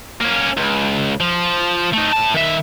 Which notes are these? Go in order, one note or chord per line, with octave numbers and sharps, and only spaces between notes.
A#3 C#4
C#2
F3
A3 D#4
A2 A5
D#3 E5